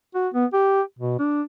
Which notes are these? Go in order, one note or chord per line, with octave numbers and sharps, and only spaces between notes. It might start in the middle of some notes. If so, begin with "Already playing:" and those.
F#4
B3
G4
B2
D4